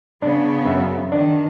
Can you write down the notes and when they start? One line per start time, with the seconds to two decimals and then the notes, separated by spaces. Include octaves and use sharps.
0.22 C#3 B3 D4
0.65 F#2 E5
1.12 D#3 D4